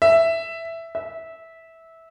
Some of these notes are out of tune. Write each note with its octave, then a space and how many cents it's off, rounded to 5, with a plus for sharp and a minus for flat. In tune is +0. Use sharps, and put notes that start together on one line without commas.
E5 +5
E5 -15